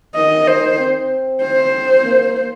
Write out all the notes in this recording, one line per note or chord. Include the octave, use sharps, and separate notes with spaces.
D#3 D#5
C5
C4
C5
A#3